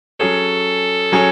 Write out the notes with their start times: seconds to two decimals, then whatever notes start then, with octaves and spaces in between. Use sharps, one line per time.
0.20 F#3 C#4 G#4 A4 C#5
1.12 F#3 C#4 G#4 C#5